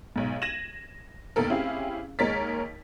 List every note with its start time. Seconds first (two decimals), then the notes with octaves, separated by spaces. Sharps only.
0.16 B1 G#2
0.42 G#6 A#6 D#7 E7 F#7
1.36 F1 D#2 B2 A4 A#4
1.50 C4 C#4 E4 G4 G#4 F5
2.19 D#2 G#3 A#4 C#5 A6 B6